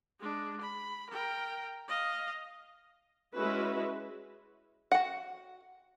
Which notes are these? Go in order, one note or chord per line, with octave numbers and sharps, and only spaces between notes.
G#3 D4
B5
A#4 G5
D#5 F5
G#3 C#4 E4 F#4 B4 E5
F#4 F#5